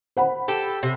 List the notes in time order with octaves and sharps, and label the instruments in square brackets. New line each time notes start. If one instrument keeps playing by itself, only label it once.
[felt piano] C5 F#5 B5
[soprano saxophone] G4 [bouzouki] A4
[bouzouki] C3